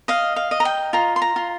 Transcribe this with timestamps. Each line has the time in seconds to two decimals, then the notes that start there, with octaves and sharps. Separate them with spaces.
0.08 D#5 F5
0.36 F5
0.51 D#5
0.60 A#5
0.65 G5
0.93 F4 A#5
1.16 C6
1.22 A#5
1.36 F4